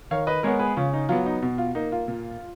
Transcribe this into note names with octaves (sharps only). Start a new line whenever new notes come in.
D#3 C#5 F5
B4 D#5
G#3 B3 A#4 C#5
G#4 B4
C#3 F4
D#4
F#3 B3 F4
D#4
B2
F4
A#3 D#4
F4
A#2